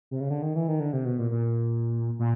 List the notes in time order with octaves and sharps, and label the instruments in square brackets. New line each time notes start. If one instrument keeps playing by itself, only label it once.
[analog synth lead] C3
C#3
D3
D#3
E3
D#3
D3
C3
B2
A#2
A#2
A#2